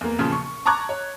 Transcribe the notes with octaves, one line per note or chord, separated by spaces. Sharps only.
E2 A#3
E2 A#2 C#3 F3
C#6
A5 A#5 C#6 D6 F#6 G#6
C#5